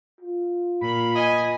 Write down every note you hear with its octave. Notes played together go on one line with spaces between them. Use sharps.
F4
A#2 B5
D#5 G#5